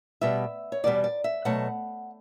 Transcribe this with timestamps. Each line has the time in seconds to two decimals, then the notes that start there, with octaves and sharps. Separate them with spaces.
0.21 B2 G3 B3 E5
0.72 C#5
0.84 E2 B2 G3 B3 D5
1.04 D5
1.24 E5
1.45 B2 F#3 A3 F#5